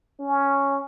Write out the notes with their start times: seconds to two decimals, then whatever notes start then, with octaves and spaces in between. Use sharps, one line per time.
0.20 C#4